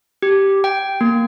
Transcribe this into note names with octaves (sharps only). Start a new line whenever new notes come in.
G4
G5
A#3